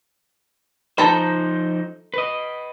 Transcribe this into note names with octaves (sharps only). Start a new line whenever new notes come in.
F3 D#4 A4 C5 A#5 B5
B4 D#5